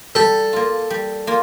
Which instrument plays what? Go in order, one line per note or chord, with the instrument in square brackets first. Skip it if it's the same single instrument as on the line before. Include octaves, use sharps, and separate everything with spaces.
[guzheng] G3 [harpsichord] A4
[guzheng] A#3 F4
G3
A#3 F4